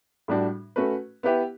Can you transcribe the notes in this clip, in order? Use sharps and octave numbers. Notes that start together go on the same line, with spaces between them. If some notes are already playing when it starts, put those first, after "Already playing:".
A2 G3 D4 F#4
A3 C#4 F#4 B4
B3 E4 G4 B4 E5